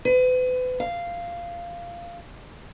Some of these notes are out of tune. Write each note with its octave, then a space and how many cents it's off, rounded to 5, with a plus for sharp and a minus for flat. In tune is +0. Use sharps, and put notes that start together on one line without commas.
B4 +40
F5 -10